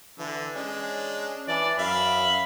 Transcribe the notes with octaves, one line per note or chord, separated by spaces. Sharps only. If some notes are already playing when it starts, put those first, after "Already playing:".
D3 E3
G#3 C#4 D4
E3 D4 D5
F#2 E5 F5 B5